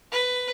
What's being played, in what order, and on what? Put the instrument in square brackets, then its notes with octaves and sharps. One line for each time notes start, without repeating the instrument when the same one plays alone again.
[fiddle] B4